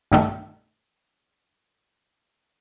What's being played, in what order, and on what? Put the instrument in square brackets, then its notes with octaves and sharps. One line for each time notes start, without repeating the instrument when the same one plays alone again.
[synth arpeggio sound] B1 G2 D#3 G3 A3